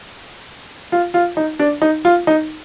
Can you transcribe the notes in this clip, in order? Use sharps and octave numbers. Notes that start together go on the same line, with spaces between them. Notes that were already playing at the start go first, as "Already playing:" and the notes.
F4
F4
D#4
D4
D#4
F4
D#4